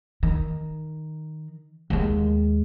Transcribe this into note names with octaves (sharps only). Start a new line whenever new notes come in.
D#3
D#2 G#3